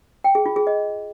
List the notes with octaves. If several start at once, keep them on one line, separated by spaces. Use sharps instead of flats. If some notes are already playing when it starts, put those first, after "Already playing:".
G5
G#4
F4
G#4
D#5